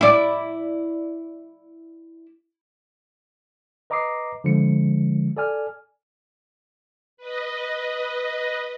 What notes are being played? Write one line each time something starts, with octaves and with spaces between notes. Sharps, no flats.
E4 D5
B4 D#5 A#5 D6 D#6 C7
D3 F3 G#3 C#7
A4 D5 G#5 F6
B4 D#5